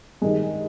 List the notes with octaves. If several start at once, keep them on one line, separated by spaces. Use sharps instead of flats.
G2 D#3 G#3